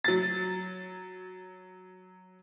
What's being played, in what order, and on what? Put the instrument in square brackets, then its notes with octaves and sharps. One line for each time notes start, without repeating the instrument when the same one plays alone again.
[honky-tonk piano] F#3 A6